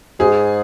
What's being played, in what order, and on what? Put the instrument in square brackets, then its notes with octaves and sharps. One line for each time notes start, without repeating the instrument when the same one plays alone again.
[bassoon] G#2 [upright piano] G#4